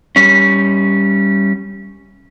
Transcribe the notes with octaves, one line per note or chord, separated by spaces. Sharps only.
G3 C#4